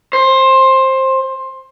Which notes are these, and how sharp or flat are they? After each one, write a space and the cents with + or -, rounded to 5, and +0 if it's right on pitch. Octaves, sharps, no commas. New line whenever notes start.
C5 +15